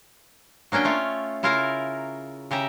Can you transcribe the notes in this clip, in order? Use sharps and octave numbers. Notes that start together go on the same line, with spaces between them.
F#3 A#3 C#4 D4 G5
A3 F4 C#5
C#3 E4 F4 A#4 F5 A#5
C#3 G4 E5 A#5